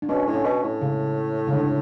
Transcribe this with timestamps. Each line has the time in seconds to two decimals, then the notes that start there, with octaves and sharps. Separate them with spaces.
0.02 D4
0.09 B2 C#4
0.27 A2
0.33 C#4
0.44 B2
0.63 A2
0.82 C#3
1.47 C#3
1.53 D3